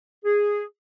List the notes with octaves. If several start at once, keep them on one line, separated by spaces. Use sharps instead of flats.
G#4